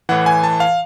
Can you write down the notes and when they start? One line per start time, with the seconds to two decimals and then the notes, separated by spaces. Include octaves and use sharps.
0.09 A2 E3 F#5
0.26 G#5
0.43 A5
0.60 F5